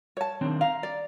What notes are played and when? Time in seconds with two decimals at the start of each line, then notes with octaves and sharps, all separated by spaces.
0.17 C#5 A5
0.41 D#3 C4 D4
0.61 F5 A#5
0.83 D5